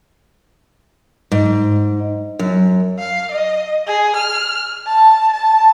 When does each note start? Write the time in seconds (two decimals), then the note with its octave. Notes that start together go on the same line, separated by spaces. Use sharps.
1.32 G#2
2.39 F#2
2.99 F5
3.31 D#5
3.87 G#4
4.16 F6
4.86 A5
5.33 A5